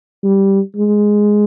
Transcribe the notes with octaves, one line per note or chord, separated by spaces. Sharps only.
G3
G#3